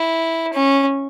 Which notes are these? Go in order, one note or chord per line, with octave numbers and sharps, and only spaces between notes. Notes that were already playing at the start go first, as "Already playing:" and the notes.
Already playing: E4
C#4